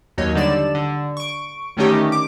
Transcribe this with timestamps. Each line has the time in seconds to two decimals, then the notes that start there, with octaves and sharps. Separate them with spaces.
0.18 D#2 F#3 D#4 C#5
0.35 D3 G3 D5 E7
0.75 D3
1.17 C#6 D7
1.77 D3 D#3 A3 C#4 D#4 G4
2.12 D6